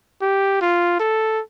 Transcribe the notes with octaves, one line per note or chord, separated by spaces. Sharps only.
G4
F4
A4